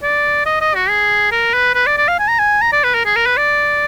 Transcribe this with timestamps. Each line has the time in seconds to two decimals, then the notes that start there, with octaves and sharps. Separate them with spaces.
0.03 D5
0.46 D#5
0.61 D#5
0.75 F#4
0.89 G#4
1.32 A#4
1.54 B4
1.75 B4
1.86 D5
1.98 D5
2.08 F5
2.19 G#5
2.28 A#5
2.39 G#5
2.62 A#5
2.72 D5
2.84 B4
2.94 A#4
3.05 G#4
3.16 A#4
3.26 B4
3.37 D5